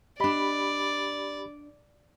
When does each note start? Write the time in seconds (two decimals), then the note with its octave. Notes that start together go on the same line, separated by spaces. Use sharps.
0.20 D4 G4 D5 D#5 B5